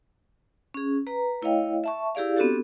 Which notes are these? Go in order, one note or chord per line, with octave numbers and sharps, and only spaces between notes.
C#4 G#4
B4 A#5
A3 E4 C#5 D#5 F5 G5
E5 A5 C#6
E4 G4 G#4 D5 F5
B3 C4 D4 F#4 G4 A4